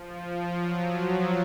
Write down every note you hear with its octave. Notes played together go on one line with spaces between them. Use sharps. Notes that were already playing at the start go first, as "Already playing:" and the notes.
Already playing: F3
F#3